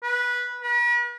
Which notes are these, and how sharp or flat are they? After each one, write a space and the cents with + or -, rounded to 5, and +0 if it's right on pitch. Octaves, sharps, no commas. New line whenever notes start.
B4 -15
B4 -45